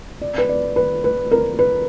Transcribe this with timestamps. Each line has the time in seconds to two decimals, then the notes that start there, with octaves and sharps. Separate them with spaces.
0.21 D5
0.38 B4
0.49 D5
0.76 B4
1.04 B4
1.31 A#4
1.59 B4